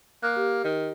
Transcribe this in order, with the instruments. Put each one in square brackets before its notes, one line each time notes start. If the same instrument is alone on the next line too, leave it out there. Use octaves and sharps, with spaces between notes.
[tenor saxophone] A#3 [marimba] F#6
[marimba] G4
[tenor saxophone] D#3